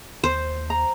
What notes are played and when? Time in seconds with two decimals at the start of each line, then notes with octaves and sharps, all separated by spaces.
0.24 D#2 C5
0.70 A#5